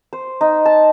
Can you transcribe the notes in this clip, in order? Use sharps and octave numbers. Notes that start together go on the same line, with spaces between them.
C5
D#4
A5